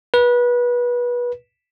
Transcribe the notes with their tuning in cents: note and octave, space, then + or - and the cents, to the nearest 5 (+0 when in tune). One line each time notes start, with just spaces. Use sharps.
B4 -25